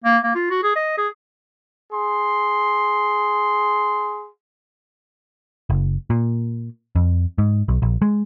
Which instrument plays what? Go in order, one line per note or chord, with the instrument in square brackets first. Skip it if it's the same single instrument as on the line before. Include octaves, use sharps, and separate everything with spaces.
[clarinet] A#3
A#3
F4
F#4
G#4
D#5
G#4
[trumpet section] G#4 C6
[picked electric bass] F#1
A#2
F2
G#2
B1
A#1
G#3